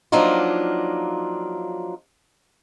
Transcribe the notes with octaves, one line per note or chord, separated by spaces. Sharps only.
F3 F#3 A#3 D4 D#4 F4